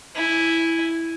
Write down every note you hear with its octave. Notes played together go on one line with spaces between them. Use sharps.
E4 G#5